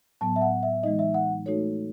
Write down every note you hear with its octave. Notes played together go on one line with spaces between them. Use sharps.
A2 F#3 B3 A5
E5
F#5
E5
E3 G#3 D#4 D#5
E5
F#5
A3 D#4 F#4 A4 C#5